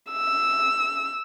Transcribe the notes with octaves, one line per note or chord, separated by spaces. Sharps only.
E6